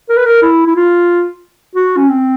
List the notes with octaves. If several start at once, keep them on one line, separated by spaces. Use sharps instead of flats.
A#4
B4
A#4
E4
E4
F4
F#4
C#4
C4